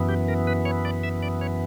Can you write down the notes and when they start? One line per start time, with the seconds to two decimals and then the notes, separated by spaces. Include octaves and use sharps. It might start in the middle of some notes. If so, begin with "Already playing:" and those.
Already playing: F#2 E3 B3
0.09 G4
0.28 A#4
0.47 B4
0.65 C#5
0.85 D5
1.03 E5
1.23 D5
1.41 C#5